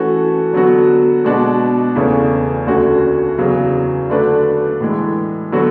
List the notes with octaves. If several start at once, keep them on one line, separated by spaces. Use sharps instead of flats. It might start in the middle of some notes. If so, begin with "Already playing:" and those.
Already playing: E3 A3 C#4 F#4 A4
D3 F#3 B3 F#4
B2 G#3 D4 F#4 B4
E2 C#3 E3 A3 C#4
D2 D3 A3 C#4 F#4
E2 C#3 F#3
D3 A3 D4 F#4 B4
A2 E3 G#3
D3 F#3 B3 F#4